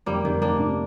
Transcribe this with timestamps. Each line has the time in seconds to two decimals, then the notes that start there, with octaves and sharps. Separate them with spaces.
0.06 F1 G3 A#3
0.25 F1 D#3
0.42 F1 A#3 D4
0.60 C3